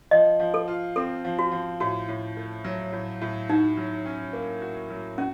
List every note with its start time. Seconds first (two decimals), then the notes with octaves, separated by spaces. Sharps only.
0.11 F3 D#5
0.40 F3
0.54 A4
0.68 F4
0.96 C4 A4
1.25 F3
1.39 F#4
1.52 F3
1.80 A2 F#4
2.08 A2
2.37 A3
2.65 F#3
2.92 A2
3.21 A2
3.50 D#4 F#4
3.77 F#3
4.06 C#4
4.33 A#3
4.62 F#4
4.90 F#3
5.18 C#4 F#4